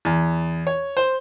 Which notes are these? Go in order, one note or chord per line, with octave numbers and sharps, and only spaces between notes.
E2
C#5
C5